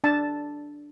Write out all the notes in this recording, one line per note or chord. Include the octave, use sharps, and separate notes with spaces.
D4 A5